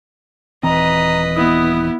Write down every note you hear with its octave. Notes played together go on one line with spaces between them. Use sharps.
D#1 E3 C4 B4 D#5 A#5
B3 E4 D#6